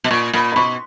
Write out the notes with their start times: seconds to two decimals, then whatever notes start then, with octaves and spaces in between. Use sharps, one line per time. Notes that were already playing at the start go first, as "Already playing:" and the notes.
0.04 B2
0.11 A#2 C#6
0.33 A#2 B5
0.52 B5
0.56 B2 C#6